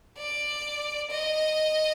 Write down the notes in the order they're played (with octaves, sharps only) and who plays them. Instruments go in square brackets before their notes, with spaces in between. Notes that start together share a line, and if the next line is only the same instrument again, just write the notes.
[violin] D5
D#5